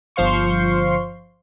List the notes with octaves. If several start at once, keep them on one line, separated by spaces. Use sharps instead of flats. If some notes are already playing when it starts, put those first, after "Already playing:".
G1 F3 C5 F5 C6 C#6